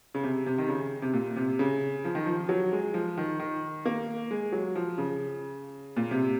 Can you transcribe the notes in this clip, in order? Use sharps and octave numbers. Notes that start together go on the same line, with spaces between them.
C#3
C3
C3
D#3
C#3
C3
A#2
C3
C#3
F3
D#3
F3
F#3
G#3
F3
D#3
D#3
A#3
G#3
F#3
F3
C#3
A#2
C3